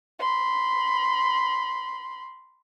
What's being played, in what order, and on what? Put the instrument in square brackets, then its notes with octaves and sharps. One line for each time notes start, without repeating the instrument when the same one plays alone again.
[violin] B5 C6